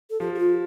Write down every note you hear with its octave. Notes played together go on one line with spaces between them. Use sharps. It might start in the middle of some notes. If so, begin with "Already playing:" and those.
A4
F3 G4
G4
F4